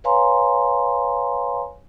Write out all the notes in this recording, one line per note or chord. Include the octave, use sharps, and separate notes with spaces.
B4 C#5 F5 G#5 A#5 C6